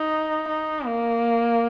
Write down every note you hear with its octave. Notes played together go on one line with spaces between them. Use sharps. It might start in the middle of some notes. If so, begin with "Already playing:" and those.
Already playing: D#4
D#4
A#3